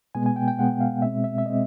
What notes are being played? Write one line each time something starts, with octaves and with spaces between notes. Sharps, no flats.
B2 G#3 B3 G#5
G#5
G5
G5
B2 G#3 B3 F#5
F5
B2 G#3 C4 E5
E5
E5
B2 G#3 C4 D#5